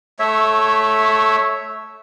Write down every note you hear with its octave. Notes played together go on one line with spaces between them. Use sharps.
A3 C#5 E5